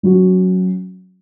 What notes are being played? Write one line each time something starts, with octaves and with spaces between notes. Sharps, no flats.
F#3 C#4 F#4